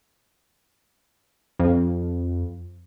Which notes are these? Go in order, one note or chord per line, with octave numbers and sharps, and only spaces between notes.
F2